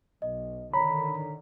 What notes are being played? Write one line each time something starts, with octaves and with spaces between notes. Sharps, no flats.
B1 D#5
D3 D#3 C#5 A#5 B5 B6